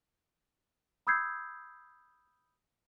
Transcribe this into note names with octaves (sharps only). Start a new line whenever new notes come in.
B5 D#6 E6 G6 G#6 C7